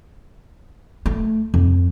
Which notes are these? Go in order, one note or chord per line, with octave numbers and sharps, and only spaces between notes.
A3
F2